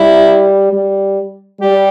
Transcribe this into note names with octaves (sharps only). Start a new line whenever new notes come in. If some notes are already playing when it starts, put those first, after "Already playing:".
Already playing: G3 E4
G3
G3 G4